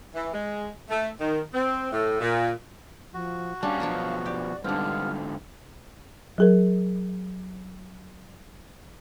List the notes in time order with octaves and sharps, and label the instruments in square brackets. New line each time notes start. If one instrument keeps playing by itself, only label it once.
[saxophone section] E3
G#3
A3
D#3
C4
A2
A#2
[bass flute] F3 [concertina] F#4
[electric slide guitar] G3 C#4 [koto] D4 [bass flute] F5
[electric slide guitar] B2 F3 [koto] F#3 D4 C#5
[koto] G4 [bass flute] D5
[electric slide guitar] G#2 D3 [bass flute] G3 [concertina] B3 F4 [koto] C4 D4
[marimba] F#3 G#4 A#4